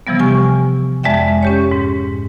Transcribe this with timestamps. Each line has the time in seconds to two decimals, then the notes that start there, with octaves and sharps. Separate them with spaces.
0.07 C3 E3 F3 G3 B3
0.19 G4 G#5 C#6 F6
1.03 F2 G#3 D5 E5 G5
1.43 C#4 G4 C#5
1.71 G#2